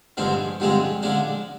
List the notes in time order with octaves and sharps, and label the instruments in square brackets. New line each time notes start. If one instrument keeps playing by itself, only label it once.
[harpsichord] G2 D3 F3 G#3 C4
G2 D3 F3 G#3 C4
D3 F3 G#3 D4